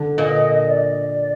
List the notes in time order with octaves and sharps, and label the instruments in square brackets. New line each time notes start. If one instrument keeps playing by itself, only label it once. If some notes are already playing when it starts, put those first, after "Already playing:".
Already playing: [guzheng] D3
[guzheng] A#2 [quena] D#5
[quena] D#5
D5